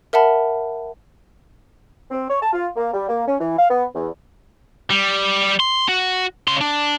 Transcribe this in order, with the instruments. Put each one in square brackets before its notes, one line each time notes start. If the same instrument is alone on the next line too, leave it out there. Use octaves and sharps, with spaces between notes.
[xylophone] A#4 E5 F#5 A5 B5
[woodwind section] C4
C#5
A5
F4
A#3
G3
A#3
C#4
E3
F5
B3
E2
[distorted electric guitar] G3
C6
F#4
C#3 C6
D4